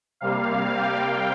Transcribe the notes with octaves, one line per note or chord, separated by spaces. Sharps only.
C3 G3 A#3 F5
G5